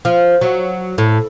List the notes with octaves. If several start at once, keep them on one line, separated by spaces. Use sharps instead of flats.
F3
F#3
A2